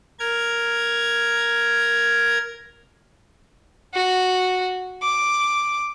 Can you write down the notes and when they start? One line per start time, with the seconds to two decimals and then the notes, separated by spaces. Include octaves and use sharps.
0.19 A#4 G#6
3.93 F#4
5.02 D6